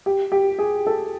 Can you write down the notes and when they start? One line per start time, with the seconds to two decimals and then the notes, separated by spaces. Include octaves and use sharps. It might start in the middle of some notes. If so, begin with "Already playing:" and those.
0.06 G4
0.32 G4
0.59 G#4
0.87 A4